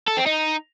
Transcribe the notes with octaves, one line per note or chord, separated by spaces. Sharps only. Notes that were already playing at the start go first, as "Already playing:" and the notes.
A4
C4
D#4